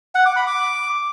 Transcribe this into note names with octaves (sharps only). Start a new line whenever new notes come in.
F#5
D6
B5
D6